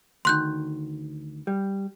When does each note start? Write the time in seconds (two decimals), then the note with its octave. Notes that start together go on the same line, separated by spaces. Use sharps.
0.25 D2 D#3 C6 F#6 G6
1.47 G3